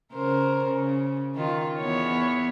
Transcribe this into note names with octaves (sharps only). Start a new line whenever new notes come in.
C#3 A#4 C5
C#3
D#3 F4
E2 B3 C#5